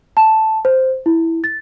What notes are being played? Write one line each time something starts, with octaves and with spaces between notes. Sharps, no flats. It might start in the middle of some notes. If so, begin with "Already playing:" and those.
A5
C5
E4
A6